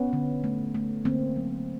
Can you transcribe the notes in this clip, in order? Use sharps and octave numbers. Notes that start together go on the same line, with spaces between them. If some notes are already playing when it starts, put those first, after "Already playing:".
Already playing: B3 C#4
D3
A3
A3
D3 A#3 C4
F#3